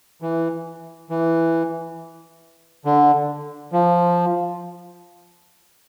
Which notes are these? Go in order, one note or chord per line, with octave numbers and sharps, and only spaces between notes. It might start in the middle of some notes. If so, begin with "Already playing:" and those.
E3
E3
D3
F3